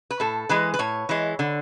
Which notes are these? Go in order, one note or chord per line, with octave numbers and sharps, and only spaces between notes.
B4
A2 A4
E3 G#3 B4
B4
A2 C#5
E3 G#3
D3